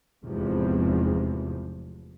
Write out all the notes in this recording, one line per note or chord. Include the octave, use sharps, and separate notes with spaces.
F1 E2 G#2 C3 F3